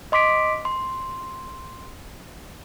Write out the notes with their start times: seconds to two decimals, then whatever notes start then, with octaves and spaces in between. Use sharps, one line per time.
0.12 D#5 C6 D6 B6 D7
0.65 C6